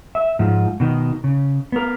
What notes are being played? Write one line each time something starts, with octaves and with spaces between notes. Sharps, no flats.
E5
G#2 F3
B2 D#3
C#3
B3 A#4